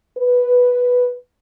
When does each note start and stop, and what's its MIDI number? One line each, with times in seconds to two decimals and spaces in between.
0.18 1.13 71